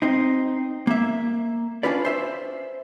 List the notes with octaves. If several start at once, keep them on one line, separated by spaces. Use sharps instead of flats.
C4 D#4
A#3 E5
C#4 D4 F4 B4 D5
C5 E5